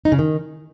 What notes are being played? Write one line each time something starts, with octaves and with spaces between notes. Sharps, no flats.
D#4
C#3
D#3